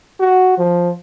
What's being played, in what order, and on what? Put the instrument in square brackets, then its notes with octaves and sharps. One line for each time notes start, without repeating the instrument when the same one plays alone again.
[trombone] F#4
F3